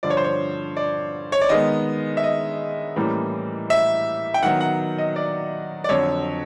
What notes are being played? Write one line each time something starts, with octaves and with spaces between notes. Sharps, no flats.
G2 D3 F3 D5
C#5
C5
C#5
D5
C#5
D5
D#3 G#3 B3 D#5
E5
D#5
A2 E3 G3 A#3 C#4
E5
G5
D#3 F#3 B3 F#5
F#5
D#5
D5
D5
F2 D3 F#3 C#5